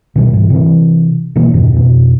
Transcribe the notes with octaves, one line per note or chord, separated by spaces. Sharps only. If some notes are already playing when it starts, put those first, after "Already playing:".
B2 D#3 F3 G3
G#2 E3
C3 E3
B2 D#3 E3 A#3
F2 G#2 B2 D#3
F2 B2